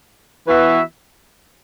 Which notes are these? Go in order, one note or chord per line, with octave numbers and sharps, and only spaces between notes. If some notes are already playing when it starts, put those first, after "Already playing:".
E3 B3 F#4 B4 E5